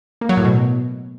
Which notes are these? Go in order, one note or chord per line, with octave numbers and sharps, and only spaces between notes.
A#3
F#3
A2
B2